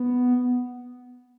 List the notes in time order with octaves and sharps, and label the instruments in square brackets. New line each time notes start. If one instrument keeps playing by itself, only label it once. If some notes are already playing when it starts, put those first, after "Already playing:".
Already playing: [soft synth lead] B3